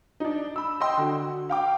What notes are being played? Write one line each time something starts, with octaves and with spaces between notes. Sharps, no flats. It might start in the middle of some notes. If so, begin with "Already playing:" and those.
D4 D#4
B5 E6
D#5 G5 C6
D3 F#4
F5 G5 D6